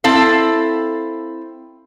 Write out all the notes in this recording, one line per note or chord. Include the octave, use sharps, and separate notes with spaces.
C4 E4 A4 F5